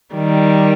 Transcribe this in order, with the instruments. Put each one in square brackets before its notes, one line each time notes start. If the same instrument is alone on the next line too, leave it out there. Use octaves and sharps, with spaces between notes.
[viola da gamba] D#3 G3